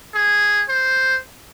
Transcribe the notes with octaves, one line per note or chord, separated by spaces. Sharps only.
G#4
C5